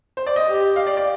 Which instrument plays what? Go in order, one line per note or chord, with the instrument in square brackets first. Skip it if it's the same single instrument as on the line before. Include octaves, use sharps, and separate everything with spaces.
[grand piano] C5
D5
D#5
[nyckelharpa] G4
[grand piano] F5
D5
D5